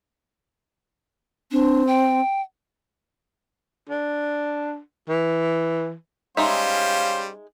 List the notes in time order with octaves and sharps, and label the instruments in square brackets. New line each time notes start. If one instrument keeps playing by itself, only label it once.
[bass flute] C4 [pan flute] D4
[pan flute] G5
[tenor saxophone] D4
E3
[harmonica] G3 C#4 C5 [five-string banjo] G#3 D#4 E5 [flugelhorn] F5